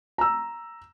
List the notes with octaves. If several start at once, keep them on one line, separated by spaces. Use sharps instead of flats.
A#5 E6